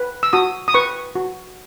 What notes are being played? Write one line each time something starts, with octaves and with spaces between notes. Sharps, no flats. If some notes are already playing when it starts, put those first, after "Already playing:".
Already playing: B4
E6
F#4 D#6
D#6
B4 C#6
F#4